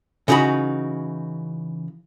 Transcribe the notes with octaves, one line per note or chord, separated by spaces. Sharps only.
C#3 E3 D#4 F#4 B5